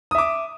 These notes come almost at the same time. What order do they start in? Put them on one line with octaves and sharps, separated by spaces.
D#6 E5 D6